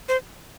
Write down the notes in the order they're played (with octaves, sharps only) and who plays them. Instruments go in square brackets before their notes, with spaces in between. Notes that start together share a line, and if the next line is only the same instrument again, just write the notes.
[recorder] C5